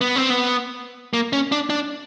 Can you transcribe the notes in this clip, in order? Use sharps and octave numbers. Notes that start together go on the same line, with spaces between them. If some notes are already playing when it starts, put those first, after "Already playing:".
B3
C4
B3
A#3
C#4
D4
D4